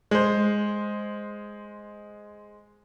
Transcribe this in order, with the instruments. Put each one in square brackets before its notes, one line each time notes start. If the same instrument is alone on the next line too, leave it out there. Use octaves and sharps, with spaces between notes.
[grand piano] G#3 C5